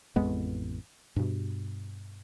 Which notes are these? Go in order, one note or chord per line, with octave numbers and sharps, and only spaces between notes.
A1 F2 G#3 B3
G2 B2